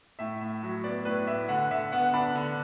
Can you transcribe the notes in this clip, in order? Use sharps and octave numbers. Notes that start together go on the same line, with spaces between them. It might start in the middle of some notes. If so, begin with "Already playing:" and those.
A2 E5
A2
F#3
B3 D5
A2 B4
A2 E5
D3 F#5
D3 E5
B3 F#5
D4 B5
D3